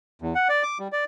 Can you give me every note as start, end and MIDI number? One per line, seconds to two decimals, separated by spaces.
0.22 0.34 40
0.35 0.48 78
0.49 0.63 74
0.63 0.78 86
0.80 0.88 55
0.92 1.04 74